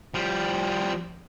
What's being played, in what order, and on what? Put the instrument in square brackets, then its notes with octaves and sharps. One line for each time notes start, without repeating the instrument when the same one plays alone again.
[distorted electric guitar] F3 G3